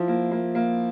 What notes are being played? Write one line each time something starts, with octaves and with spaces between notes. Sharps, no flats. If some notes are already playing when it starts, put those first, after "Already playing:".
Already playing: F3 E4
A#3
A#3
A#3